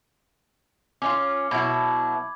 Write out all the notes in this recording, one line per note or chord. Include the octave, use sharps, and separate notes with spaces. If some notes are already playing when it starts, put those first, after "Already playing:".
C#4 D#4 F4 D6
B2 F#3 E4 B5 G#6